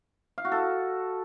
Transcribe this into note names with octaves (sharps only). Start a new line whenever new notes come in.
F5
F#4
A4